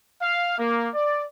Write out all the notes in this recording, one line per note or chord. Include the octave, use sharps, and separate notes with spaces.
F5
A#3
D5